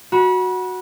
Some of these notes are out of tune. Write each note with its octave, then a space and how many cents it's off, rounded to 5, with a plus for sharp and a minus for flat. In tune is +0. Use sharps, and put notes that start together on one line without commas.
F#4 -5 B5 -35